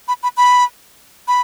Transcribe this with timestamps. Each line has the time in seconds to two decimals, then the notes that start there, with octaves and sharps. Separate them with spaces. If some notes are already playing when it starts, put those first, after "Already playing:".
0.08 B5
0.23 B5
0.37 B5
1.28 B5